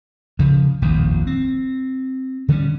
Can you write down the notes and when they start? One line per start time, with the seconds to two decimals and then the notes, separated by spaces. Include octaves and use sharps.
0.39 C#3 F3
0.82 D#1 A#1 F2 D#3
1.27 C4
2.48 D3 E3 G3 C#4